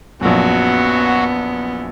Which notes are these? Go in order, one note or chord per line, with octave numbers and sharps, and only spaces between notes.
A#1 F#2 F#3 B3 F#4